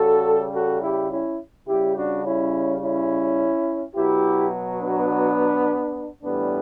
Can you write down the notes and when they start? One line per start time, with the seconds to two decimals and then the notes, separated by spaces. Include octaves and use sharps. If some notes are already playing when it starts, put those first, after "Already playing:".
Already playing: C#3 G3 F#4 A4
0.54 F#4 A4
0.82 E4 G4
1.11 C#4 E4
1.67 C#3 G3 E4 G4
1.96 D4 F#4
2.25 C#4 E4
2.82 C#4 E4
3.95 B2 F#3 E4 G4
4.81 B3 D4
6.23 A2 E3 G3 B3 D4